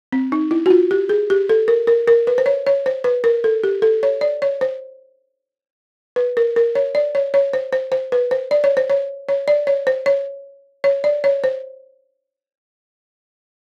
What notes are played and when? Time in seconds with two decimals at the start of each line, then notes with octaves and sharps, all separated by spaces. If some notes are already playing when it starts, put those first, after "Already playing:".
0.12 C4
0.32 D#4
0.51 E4
0.66 F#4
0.70 F4
0.91 G4
1.09 G#4
1.30 G4
1.49 A4
1.68 A#4
1.87 A#4
2.08 A#4
2.27 B4
2.38 C5
2.46 C#5
2.67 C#5
2.86 C5
3.04 B4
3.24 A#4
3.44 A4
3.64 G4
3.82 A4
4.03 C#5
4.21 D5
4.42 C#5
4.61 C5
6.16 B4
6.37 A#4
6.56 A#4
6.75 C#5
6.95 D5
7.15 C#5
7.34 C#5
7.53 C5
7.73 C5
7.92 C5
8.12 B4
8.31 C5
8.51 D5
8.64 C#5
8.77 C5
8.90 C#5
9.29 C#5
9.48 D5
9.67 C#5
9.87 C5
10.06 C#5
10.84 C#5
11.04 D5
11.24 C#5
11.44 C5